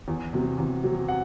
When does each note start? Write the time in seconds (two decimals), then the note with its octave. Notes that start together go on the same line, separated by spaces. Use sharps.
0.08 E2
0.33 C3 F#3
0.58 E2
0.84 C3 F#3
1.08 F#5